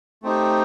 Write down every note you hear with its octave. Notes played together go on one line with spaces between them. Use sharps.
A3 C4 D#4 G4